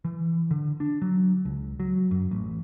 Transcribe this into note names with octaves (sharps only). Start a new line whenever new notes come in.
E3
D3
D4
F#3
C#2
F#3
F#2
A1